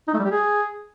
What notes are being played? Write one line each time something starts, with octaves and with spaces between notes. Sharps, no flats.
D#4
A3
G3
G4
G#4